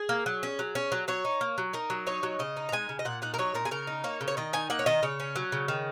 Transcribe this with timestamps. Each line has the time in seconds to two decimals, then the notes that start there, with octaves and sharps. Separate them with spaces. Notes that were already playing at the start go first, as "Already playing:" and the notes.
Already playing: G#4
0.09 A#3
0.26 F#3
0.43 C#4
0.59 F#3
0.75 C#4
0.92 F#3
1.08 F#3 C#5
1.25 D#4
1.41 A#3
1.58 F#3
1.73 D#4 A#4
1.90 F#3
2.07 D#4 C#5
2.23 F#3
2.39 C#3 D#5
2.57 D#4
2.69 A#5
2.72 G#3 G#5
2.89 C#3
2.99 D#5
3.05 A#2 F#5
3.22 D#4 F#5
3.34 A#4
3.38 F#3 C#5
3.54 A#2 A#4
3.65 G#4
3.71 C#3 A#4
3.87 D#4
4.04 A#3 C#5
4.21 C#3
4.28 C#5
4.37 D#3 D#5
4.53 D#4 G#5
4.70 A#3 F#5
4.79 C#5
4.86 D#3 D#5
5.03 C#3 C#5
5.20 C#4
5.36 F#3
5.52 C#3
5.68 D#3